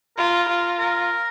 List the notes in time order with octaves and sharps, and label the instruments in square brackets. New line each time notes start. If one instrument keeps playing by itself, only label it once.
[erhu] F4 [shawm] A#4
[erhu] F4
[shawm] A#4